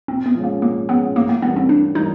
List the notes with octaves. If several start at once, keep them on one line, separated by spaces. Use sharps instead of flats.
A#2 C4
B3
F3 G#3 C#4
A#3
A#2 A#3
F3 G#3 B3 C#4
A2 A#3
A#3
E3 G3 A#3 B3 C#4
C4
A2 D4
E3 G3 A#3 C#4 D#4